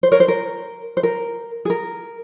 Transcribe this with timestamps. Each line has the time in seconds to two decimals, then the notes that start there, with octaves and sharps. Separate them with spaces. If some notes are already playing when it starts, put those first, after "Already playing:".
0.03 C5
0.12 A#4 C#5
0.20 C5
0.28 A#4
0.97 C5
1.03 A#4
1.65 G#4
1.70 A#4